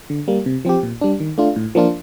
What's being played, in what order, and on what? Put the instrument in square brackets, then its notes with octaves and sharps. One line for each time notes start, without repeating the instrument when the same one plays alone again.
[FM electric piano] D3
G3 A#3
C3
F3 C4 G4
A#2
G3 D4
D#3
A3 D4 F4
A2
F3 A#3 D4 F4